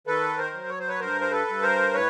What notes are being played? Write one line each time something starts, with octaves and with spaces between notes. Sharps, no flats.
D#3 A4 B4
A#4 C5
F#3
C#5
C5
B4 C#5
G2 A#4 C5
C5
A4 B4
G2
A#4 C5
A2 B4 C#5